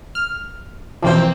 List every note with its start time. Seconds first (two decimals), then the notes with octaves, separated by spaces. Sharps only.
0.15 F6
1.02 B2 E3 F3 A#3 C4 C5